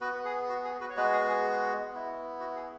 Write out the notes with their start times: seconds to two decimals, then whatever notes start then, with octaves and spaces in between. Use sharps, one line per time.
0.01 B3 F#4 B4
0.25 G#4
0.49 F#4
0.64 G#4
0.80 F#4 B4
0.90 C#5
0.96 G#3 B3 F#4 B4
1.12 G#4
1.28 G#4
1.92 B3 E4
2.40 F#4
2.55 G#4